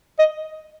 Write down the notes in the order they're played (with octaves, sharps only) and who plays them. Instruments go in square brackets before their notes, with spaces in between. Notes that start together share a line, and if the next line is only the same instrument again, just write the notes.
[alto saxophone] D#5